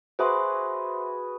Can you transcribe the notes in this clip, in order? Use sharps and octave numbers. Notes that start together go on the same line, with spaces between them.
F#4 G#4 B4 C5 E5 C6